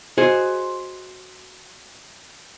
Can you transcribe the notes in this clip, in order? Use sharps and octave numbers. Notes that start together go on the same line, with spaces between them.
F#4 G#4 C5 D#5